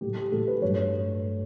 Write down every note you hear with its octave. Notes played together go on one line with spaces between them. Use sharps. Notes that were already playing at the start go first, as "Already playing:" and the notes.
A2 F#3 A3 G4
G4
A2 F#3 A3 A4
B4
G2 F#3 A3 C#5